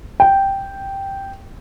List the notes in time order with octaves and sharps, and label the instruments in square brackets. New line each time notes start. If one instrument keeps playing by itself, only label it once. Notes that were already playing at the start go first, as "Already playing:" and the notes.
[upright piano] G5